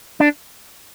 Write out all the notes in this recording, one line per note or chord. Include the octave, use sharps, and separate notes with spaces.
D4